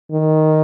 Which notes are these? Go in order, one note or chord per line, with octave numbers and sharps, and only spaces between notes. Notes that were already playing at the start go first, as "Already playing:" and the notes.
D#3